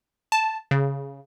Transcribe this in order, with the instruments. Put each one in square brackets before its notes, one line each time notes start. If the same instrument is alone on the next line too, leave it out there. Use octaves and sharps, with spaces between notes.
[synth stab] A5
C#3